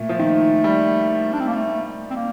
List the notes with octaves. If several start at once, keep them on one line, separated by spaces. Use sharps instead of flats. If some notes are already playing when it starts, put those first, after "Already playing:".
Already playing: A#2 A3
F3
D#3
G3
D4
C4
A#3
A3
C4
A#3